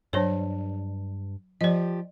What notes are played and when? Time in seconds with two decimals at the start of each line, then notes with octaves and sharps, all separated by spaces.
0.13 G2 F#3 D4 C5 C#5
1.61 F3 G4 D5 D#5